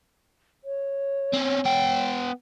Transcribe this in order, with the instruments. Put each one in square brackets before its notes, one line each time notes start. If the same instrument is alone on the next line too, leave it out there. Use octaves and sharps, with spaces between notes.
[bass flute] C#5
[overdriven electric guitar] C4 C#4
B3 G5